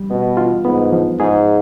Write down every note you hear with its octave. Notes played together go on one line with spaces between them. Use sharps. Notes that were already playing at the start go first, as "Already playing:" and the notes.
Already playing: G3
B2 B3
F4
G#2 B3
F3
G#2 G#4